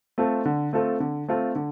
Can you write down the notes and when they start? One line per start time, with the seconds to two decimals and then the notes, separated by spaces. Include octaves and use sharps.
0.18 A3 C4 F4 A4
0.45 D3
0.73 A3 C4 F4 A4
1.00 D3
1.28 A3 C4 F4 A4
1.55 D3